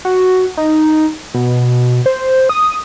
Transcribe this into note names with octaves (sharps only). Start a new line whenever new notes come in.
F#4
D#4
B2
C5
D#6